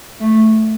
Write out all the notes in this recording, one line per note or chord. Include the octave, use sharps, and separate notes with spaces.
A3